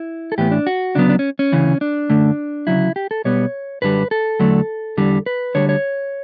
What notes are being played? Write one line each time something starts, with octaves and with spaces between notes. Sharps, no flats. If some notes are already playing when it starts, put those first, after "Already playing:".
Already playing: E4
A4
A2 E3 B3 G4
D4
F#4
D2 C#3 F#3 B3 D4
D4
C#4
C#4
D2 C#3 E3
D4
F#2 D3 A3
D2 C#3 F#3 E4
G4
A4
B1 B2 G3 B3 C#5
F#2 D3 G3 B4
A4
E2 D3 F#3 A3
E2 D3 G3
B4
D2 D3 G3 C#5
C#5